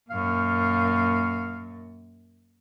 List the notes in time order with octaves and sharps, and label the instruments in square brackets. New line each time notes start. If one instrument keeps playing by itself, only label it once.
[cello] F#2 A#2 [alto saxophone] F5